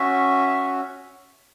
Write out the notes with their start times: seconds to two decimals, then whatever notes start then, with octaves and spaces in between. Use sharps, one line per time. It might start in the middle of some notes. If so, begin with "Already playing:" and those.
Already playing: C#4 F#4 E5
0.47 E5